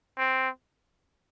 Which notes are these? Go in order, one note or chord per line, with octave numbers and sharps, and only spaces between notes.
C4